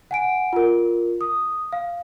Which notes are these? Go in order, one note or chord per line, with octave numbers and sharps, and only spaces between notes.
F#5 G#5 D7
F4 A#4
D#6
F5